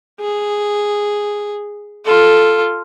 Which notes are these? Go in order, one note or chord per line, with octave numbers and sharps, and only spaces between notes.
G#4
F4 A4